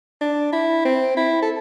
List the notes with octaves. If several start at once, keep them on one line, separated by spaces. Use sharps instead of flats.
D4
E4
C4
E4
A4